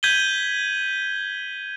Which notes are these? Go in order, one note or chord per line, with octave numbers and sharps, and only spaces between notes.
G6 G#6 B6 D#7 F#7 G7